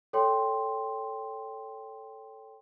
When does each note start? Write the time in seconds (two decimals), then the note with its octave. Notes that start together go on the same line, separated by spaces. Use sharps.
0.13 A4 C#5 G5 C6